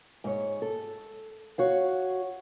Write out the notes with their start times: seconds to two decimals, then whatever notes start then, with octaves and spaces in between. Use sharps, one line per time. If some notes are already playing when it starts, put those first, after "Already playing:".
0.24 G#2 C#5
0.62 A4
1.58 F#4 C#5 F5